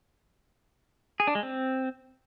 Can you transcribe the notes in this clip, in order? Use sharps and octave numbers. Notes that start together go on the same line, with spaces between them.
G#4
D4
G#3
C4